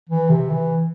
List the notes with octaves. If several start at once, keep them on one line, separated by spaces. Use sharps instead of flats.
E3
C3
E3